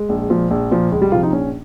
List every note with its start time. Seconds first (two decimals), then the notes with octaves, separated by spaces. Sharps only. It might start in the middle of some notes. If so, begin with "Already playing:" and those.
Already playing: G#3
0.09 A#1
0.30 A#2 F3
0.51 A#1
0.71 A#2 F3
0.92 C#2 G#3
1.02 G3
1.12 C3 F3 F4
1.23 D#4
1.32 A#1 C#4